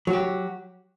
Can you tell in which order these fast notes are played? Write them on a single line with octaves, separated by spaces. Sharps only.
F#3 F#4 G4